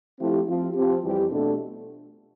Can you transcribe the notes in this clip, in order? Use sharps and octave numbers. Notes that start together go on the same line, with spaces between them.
F3 A3 C4 E4 G4
F3 C4 F4
F3 C4 G4
F2 E3 G3 C4 G4
B2 A3 D4 A4